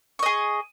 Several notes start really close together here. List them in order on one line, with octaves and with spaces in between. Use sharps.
C#6 D#5 G#4